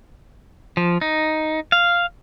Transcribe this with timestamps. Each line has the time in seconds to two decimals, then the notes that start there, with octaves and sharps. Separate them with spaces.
0.77 F3
1.01 D#4
1.72 F5